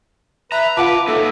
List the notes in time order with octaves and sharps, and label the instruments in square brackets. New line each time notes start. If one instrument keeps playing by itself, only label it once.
[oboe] B4 [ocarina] E5 [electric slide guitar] A#5
[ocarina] F4 [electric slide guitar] B4 [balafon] F5 F#5 A5 [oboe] D6
[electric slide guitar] F#3 A#3 D#4 [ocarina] A4 [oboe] E5